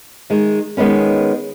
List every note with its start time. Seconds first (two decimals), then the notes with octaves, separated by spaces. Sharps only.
0.30 D#3 G#3
0.77 D#3 G#3 B3 C#4